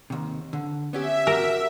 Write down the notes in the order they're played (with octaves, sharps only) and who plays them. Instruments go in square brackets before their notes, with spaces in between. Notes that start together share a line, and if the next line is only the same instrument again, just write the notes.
[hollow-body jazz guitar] D#2 C3
D3
[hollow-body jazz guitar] B3 C#4 G4 [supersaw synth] E5
[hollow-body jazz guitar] F#4 G4 [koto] A#4